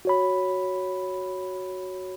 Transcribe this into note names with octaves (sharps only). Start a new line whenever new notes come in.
F#4 C#5 B5